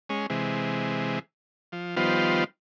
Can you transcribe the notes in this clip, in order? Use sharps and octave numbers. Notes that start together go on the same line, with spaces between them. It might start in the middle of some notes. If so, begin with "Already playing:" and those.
G#3 C#4
C3 E3 G#3
F3
D#3 F3 G3 B3 F4 C5